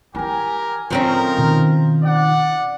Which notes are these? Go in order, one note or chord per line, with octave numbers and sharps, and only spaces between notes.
E3 E4 G4 A#4 G#5
D3 F3 C4 C#4 D#4 F4 A#4
B2 D#3
D5 F#5